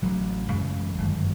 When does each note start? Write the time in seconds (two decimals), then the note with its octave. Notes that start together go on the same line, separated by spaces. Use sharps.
0.02 A1 A2 F#3
0.50 F#2 C#3 E3 G#3
0.98 G1 F#2 D#3 G#3